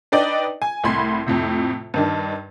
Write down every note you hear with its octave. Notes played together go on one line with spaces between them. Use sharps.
D4 D#4 B4 D5 D#5 G5
G#5
C2 A2 B5 C6 G#6
F2 A2 C3
G2 D#3 D4